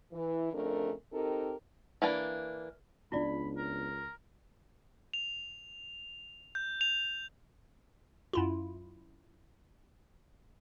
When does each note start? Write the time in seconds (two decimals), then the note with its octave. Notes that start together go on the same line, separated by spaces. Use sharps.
0.13 E3
0.53 F2 C#3 A3 D4 A#4
1.12 C4 D#4 G4 A4 A#4
2.02 E3 A#3 D4
3.12 C#2 B3 C#4 D4 E4 F4 D5 B5
3.57 A#4
5.14 F7
6.55 G6
6.81 F7
8.33 F#2 E4 F4